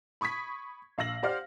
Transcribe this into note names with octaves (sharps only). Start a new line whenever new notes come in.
B5 C#6 D#6 G#6 B6
A#1 F5 E6 A#6 F#7
G4 C5 D5 F5 F#5 F6